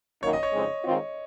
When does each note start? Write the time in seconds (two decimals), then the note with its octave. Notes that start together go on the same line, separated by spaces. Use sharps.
0.22 F#2 D#3 A#3 D#4 C#5
0.33 D#5
0.43 C#5
0.53 F2 C#3 G#3 C4 D#4
0.84 D#3 G#3 C4 F4